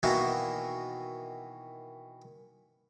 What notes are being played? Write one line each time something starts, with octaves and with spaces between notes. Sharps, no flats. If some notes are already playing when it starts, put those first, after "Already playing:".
B2 D#3 E3 A#3 E4 F#4